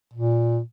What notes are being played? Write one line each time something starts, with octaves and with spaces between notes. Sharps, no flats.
A#2